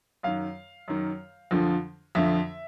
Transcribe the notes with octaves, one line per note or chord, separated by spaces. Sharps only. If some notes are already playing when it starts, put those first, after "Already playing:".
F#2 D#3 F5
F#2 D#3
F2 D3 F3
F2 D3 F3 E5